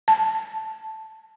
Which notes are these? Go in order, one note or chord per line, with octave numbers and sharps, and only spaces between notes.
A5